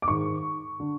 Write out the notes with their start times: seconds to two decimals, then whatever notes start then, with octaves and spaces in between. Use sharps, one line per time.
0.02 D6
0.08 G#2 D#3 C#6
0.80 D3